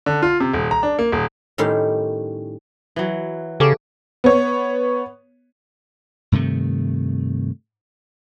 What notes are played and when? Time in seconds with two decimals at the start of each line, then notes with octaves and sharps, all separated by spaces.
0.06 D3
0.22 F4
0.40 C3
0.53 D#1
0.71 A#5
0.83 D4
0.99 A#3
1.12 D#1
1.58 A2 D#3 G3 C#4 C6
2.96 E3 F#3
3.60 C#3 G4 A4 D6
4.24 B3 C#5
6.32 G2 C3 D#3 A3